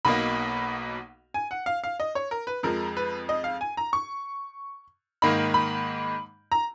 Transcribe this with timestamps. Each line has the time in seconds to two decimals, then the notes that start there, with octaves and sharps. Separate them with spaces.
0.05 B1 B2 A#3 D#4 B5
1.34 G#5
1.51 F#5
1.66 F5
1.84 F5
2.00 D#5
2.15 C#5
2.31 A#4
2.47 B4
2.63 F2 F3 G#3 A#4
2.97 B4
3.29 D#5
3.44 F5
3.61 G#5
3.77 A#5
3.93 C#6
5.22 G#2 D#3 A#3 D#4 B5
5.54 B5
6.52 A#5